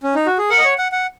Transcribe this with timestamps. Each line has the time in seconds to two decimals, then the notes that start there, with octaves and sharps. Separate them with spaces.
0.03 C#4
0.15 D#4
0.26 F#4
0.38 G#4
0.50 A#4 F#5
0.58 D#5
0.64 C#5
0.78 F#5
0.92 F#5